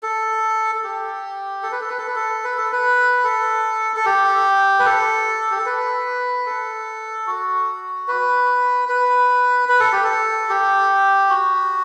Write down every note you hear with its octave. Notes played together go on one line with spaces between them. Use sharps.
A4
A4
G4
A4
B4
A4
B4
A4
B4
A4
B4
A4
B4
A4
A4
G4
B4
A4
G4
A4
B4
A4
F#4
B4
B4
B4
A4
G4
A4
G4
F#4